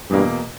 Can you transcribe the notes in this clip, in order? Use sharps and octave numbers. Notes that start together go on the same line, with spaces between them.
E2 G2 B2 A#3